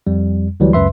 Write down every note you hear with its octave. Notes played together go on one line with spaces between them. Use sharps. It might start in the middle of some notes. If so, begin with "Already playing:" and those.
F2 G3
D2 E3 F#3 G3
C#2 F#2 B4 E5 C6